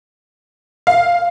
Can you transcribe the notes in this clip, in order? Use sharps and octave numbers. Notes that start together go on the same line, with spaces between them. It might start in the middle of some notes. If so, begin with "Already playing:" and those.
F5